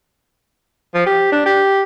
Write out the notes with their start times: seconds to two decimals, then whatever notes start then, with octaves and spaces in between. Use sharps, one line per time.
0.94 F3
1.06 G4
1.32 D4
1.46 G4